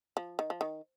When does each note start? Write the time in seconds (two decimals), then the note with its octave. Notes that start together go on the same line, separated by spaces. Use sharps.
0.17 F3
0.39 D#3
0.50 F3
0.61 D#3